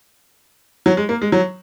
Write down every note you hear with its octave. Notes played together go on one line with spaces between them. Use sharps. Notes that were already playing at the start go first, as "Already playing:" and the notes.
F#3
G#3
A#3
G#3
F#3